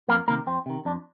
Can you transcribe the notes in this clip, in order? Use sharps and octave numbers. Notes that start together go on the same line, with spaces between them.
F2 A#3 A#4
C3 D#3 A#3 A#4
F2 C4
C3 D#3
F2 D4